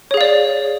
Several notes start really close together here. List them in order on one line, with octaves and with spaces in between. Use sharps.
C#5 G#4 F5 D5